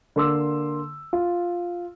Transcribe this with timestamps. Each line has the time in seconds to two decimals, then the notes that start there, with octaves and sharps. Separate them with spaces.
0.16 D3 A#3 C6 D6 E6
1.13 F4